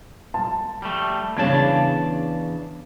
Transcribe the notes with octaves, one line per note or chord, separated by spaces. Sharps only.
A5
G3 A3
E2 C#3 D4 C#5 A5 G#6